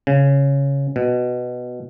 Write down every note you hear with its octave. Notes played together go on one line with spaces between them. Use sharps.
C#3
B2